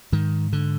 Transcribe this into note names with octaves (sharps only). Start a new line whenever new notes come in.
G#2 D#3
D3